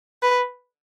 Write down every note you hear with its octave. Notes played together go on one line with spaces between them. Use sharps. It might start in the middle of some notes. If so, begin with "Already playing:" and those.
B4